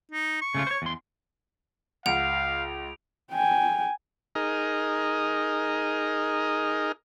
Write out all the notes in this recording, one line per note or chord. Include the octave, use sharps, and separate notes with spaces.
D#4
C#6
C#3 A3 F4
C5 C#5
E2 C6
C#2 F5 F#5 D7 F7
G5 G#5
D#4 G#4 A#4 D#5